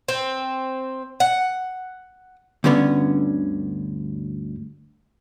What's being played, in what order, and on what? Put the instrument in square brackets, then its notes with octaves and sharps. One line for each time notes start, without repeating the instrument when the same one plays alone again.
[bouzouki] C4
F#5
[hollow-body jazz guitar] D2 G2 D3 B3 C#4